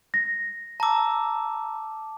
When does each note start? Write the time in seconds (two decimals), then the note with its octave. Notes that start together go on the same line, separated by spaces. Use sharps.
0.14 A#6
0.80 A5 A#5 D6 E6